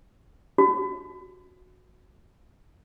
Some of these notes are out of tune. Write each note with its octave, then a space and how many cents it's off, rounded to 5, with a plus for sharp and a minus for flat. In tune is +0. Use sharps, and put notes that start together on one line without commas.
F#4 -20